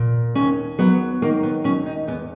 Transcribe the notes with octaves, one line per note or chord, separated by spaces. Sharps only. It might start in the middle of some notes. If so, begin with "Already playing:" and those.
Already playing: A#2
D#2 C#4
F#3 B3
D#3 A#3
B3
D#2 C#4
D#4
E2 B3